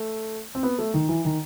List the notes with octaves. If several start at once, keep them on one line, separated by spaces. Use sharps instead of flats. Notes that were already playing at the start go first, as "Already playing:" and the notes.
Already playing: A3
C4
B3
A3
D#3
E3
D#3